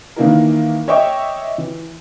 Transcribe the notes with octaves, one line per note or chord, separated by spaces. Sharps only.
D#3 E3 A#3 D4 E4 A#4
C#5 D#5 E5 G5 C#6 D6
E3